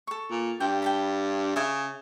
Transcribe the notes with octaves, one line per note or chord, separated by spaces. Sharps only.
A4 C#6
A#2
G2 G5
G5 A5 B5
C#3 E5 G#5